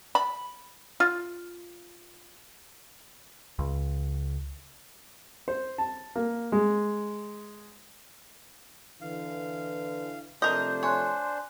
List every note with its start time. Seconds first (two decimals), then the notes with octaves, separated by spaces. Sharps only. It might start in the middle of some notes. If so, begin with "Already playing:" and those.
0.15 B5
1.00 F4
3.59 C#2
5.48 C5
5.78 A5
6.16 A#3
6.52 G#3
9.01 D3 E3 F5
10.42 C3 F3 A3 D4 A#4 C5 D#5 G6
10.83 C#5 G#5 C6 F#6